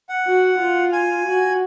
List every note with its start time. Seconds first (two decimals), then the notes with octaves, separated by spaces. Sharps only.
0.09 F#5
0.26 F#4
0.59 F4
0.93 G#5
1.26 F#4